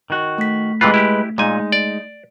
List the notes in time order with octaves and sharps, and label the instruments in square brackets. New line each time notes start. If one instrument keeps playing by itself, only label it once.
[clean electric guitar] D#3 F#4
[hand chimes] A3 B6
[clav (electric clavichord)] C3 E3 F4 [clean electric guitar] G#3 B4
[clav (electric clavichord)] E4 G4
[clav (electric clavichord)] A#2 G#5 [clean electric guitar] G#3 D#4
[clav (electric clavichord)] D5